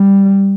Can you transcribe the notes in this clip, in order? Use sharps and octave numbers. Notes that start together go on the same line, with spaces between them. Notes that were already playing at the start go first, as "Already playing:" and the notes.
Already playing: G3